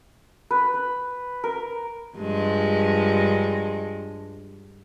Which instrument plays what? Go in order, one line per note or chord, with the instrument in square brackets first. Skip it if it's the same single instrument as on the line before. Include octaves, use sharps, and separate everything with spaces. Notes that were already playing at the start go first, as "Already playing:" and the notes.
[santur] B4
B4
A#4
[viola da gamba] G2 F3 G#3